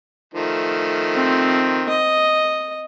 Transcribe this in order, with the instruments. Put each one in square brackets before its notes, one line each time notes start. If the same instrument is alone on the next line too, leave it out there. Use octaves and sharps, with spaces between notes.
[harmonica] D#3 F3 A3
[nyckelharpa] C4
D#5